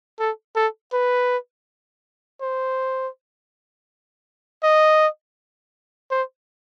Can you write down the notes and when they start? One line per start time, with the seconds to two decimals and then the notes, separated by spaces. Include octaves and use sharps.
0.20 A4
0.56 A4
0.93 B4
2.42 C5
4.63 D#5
6.11 C5